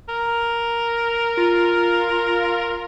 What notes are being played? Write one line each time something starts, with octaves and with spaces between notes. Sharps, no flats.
A#4
F4